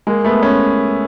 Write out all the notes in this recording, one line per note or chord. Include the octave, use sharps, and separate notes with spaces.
G#3 A#3
A3 B3
B3 C#4